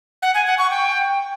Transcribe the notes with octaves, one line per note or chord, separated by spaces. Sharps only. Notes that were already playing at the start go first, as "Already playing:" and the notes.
F#5
G#5
F#5
C#6
G5